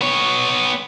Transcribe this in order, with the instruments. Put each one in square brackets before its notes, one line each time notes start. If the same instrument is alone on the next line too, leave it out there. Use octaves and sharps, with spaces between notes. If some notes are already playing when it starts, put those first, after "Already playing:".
[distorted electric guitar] B3 C#5